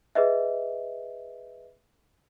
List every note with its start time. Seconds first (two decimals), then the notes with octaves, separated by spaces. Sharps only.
0.15 G#4 B4 D#5 E5